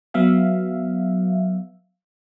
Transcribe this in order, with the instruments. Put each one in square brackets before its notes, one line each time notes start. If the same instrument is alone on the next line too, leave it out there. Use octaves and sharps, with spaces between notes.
[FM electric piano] F#3 B3 E5 F5